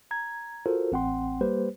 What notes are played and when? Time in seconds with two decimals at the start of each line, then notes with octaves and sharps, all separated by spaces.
0.11 A#5 G#6
0.66 F4 F#4 A4 A#4 C5
0.92 A1 C4 F#5 G5 C6
1.41 G3 A#3 G4 B4 C5